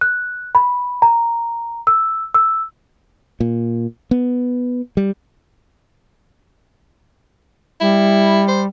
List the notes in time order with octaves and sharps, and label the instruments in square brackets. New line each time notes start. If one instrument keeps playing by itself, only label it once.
[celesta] F#6
B5
A#5
E6
E6
[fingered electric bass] A#2
B3
G3
[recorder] G3 [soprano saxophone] E4
[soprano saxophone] C5